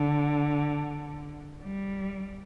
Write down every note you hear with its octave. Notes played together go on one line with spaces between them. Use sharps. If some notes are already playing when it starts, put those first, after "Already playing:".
Already playing: D3
G3